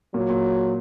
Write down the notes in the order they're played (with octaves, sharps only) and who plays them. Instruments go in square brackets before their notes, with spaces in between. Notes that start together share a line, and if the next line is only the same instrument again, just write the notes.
[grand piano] A#2 [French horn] F#3
[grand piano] A#2